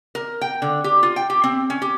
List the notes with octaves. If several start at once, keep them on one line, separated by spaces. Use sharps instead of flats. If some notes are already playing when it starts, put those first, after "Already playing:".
A#4
G5
D3
G4
F4
G5
G4
C4
C#4
G4